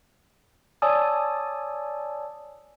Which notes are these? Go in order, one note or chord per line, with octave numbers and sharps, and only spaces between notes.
C#5 D5 G#5 A5 D#6 E6